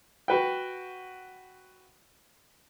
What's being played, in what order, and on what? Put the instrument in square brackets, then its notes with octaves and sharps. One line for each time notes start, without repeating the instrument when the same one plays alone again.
[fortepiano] F#4 B4 G5